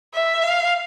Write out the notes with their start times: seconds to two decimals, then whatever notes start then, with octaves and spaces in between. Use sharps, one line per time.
0.14 E5
0.43 F5